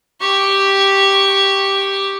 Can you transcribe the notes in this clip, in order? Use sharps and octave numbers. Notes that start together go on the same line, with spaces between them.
G4 C#6